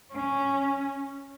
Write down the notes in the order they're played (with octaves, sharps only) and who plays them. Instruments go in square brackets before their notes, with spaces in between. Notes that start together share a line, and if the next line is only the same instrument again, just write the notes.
[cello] C#4